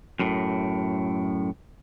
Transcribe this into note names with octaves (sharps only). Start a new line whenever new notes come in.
F#2 A2